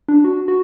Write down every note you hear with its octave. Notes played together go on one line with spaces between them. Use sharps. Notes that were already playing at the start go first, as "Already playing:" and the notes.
D4
F#4
F#4